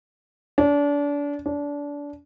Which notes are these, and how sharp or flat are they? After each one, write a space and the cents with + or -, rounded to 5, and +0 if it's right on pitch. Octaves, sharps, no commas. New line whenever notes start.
D4 -30
D4 -25